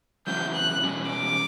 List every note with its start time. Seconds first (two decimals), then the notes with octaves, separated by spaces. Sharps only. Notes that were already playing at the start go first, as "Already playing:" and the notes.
0.27 E2 C#3 F#3 C#4 E4 G6
0.55 F#6
0.82 E2 B2 G3 C#4
1.11 D6